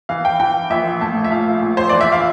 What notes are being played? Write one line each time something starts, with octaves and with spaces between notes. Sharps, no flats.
E3 F5
G5
E3 G5
A#1 E5
A2 A5
E5
A#1 F5
A#1
C5
E3 D5
E5
F5